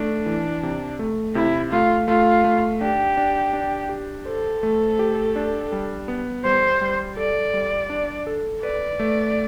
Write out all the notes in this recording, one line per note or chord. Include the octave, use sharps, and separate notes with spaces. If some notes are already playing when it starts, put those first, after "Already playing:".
Already playing: A3 D4
E3
C3
A3
C3 E4
A3 F4
A3 F4
A3
D4 G4
D4
D4
G4
A4 C5
A3
G4
D4
G3
B3
G3 C5
G3
A4 D5
G3
D4
A4
B4 D5
A3